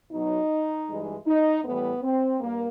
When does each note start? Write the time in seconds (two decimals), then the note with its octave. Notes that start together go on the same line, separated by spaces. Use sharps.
0.11 B2 F#3 D#4
0.88 G2 E3 G#3
1.26 D#4
1.64 A2 E3 G3 B3
2.02 C4
2.40 G2 A#3